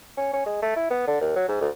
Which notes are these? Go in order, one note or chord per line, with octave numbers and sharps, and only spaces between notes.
C#4
C#4
G#3
A3
E4
B3
D3
D#2
F#3
G#2
D2